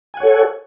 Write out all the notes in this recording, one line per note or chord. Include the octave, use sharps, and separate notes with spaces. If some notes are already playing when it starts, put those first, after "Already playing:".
A4 C#5 F#5 G#5